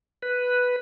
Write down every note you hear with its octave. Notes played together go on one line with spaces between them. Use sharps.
B4